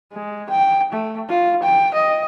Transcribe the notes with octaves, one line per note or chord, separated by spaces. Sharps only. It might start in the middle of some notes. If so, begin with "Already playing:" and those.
G#3
G5
A3
F4
G5
D#5